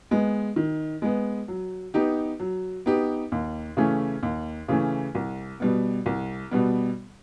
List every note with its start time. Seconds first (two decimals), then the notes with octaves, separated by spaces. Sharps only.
0.11 G#3 B3
0.56 D#3
1.02 G#3 B3
1.48 F#3
1.94 B3 D#4 G4
2.40 F#3
2.86 B3 D#4 G4
3.32 D#2
3.77 C#3 E3 A3 C#4
4.23 D#2
4.68 C#3 E3 A3 C#4
5.15 C2
5.60 B2 G3 B3
6.06 C2
6.51 B2 G3 B3